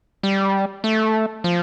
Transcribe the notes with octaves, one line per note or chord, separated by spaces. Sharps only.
G3
A3
F3